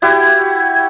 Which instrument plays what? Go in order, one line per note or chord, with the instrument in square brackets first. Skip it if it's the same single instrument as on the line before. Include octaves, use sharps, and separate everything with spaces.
[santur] E4 F#4 G4 [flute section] G#6